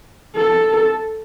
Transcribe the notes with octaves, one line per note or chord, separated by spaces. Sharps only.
A4